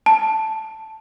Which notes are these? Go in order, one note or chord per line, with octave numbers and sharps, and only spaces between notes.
A5